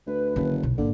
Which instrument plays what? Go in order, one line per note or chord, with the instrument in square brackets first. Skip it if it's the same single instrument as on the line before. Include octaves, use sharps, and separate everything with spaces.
[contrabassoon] D2 [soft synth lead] B4
[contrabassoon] F#1 [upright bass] D3 D#3
[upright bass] B1
[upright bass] G#1 [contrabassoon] D3 [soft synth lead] A#3